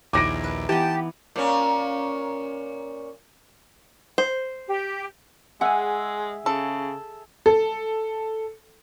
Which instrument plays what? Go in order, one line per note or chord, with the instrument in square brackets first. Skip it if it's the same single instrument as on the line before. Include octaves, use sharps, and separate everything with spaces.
[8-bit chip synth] A#1 D#2 [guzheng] D#4 E4 G#5 [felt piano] D6 A#6 D7
[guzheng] B4
[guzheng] E3 B3 [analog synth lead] G4 [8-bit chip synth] A5
[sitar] A#2 C#4
[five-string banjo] C5
[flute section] G4
[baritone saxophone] G#3 [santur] G#4 E5 [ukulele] F#5 G#5
[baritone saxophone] C#3 [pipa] A4
[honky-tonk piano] A4